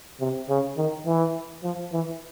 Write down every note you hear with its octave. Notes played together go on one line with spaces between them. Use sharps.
C3
C#3
D#3
E3
F3
E3